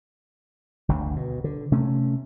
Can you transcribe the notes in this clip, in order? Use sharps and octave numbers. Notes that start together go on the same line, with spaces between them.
G1 D2 G2
B2
D3
C3 A3 C#4